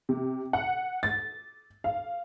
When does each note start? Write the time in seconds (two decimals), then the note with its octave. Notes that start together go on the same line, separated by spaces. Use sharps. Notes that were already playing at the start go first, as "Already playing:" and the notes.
0.09 C3
0.53 F#5
1.03 A6
1.84 F5